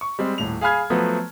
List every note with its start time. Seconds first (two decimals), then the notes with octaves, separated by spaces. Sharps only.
0.01 C#6
0.19 G3 G#3 C4
0.38 D#1 A2 F7
0.61 G#4 F5 G#5 B5 F6 G#6
0.90 F3 F#3 A3 B3 B4